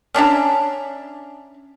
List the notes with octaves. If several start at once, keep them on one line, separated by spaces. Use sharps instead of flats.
C#4 D4 E5 A#5